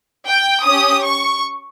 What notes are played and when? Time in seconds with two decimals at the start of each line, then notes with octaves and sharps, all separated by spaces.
0.27 G5
0.65 C#4 G4 D#6
1.04 C#6